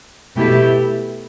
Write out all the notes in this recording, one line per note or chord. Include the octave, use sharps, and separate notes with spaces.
B2 A3 E4 G4 B4